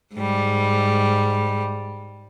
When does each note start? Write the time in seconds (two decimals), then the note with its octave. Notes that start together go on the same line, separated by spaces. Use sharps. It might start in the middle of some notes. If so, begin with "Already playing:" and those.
0.14 G#2 G3